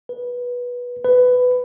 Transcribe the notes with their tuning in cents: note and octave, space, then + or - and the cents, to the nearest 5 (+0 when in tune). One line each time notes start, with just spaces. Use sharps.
B4 -15
B4 +15